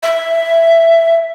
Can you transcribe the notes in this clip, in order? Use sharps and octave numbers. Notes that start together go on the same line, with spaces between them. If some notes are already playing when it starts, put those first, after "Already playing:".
E5